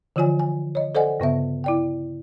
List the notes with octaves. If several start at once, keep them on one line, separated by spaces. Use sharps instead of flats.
D3 E3 F3 F4 C#5 G#5
G#5
C#5 D#5
A4 C5 D5 D#5 F#5 G#5
G2 C#3 B3 E5
E4 D5 G5